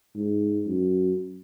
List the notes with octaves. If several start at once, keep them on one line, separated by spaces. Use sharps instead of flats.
G#2
F#2